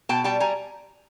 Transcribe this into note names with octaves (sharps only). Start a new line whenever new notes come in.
B2 G5 A5
G3 G5 A5
G3 G#5 A#5